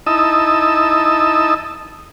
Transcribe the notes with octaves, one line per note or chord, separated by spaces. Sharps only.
D#4 E4 D#5 A5 E6